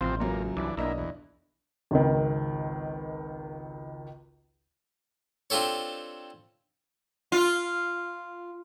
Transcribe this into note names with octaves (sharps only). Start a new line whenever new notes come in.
A1 C3 F3 C4
C#2 F#2 A#3
C2 E3 D4
B1 A#3 D4 E4 D#5
E2
G#1 C#2 D#3
C4 D4 F4 G4 A4 C#5
F4